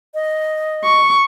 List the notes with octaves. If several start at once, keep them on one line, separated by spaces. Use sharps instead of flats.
D#5
C#6